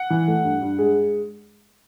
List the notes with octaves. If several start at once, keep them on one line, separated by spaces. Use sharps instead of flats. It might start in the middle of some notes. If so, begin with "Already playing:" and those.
Already playing: F#5
E3
A3
G2
G2
G#3